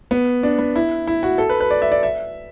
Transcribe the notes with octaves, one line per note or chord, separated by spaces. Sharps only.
B3
D4
B3
E4
E4
F#4
A4
B4
B4
D5
E5
D5
E5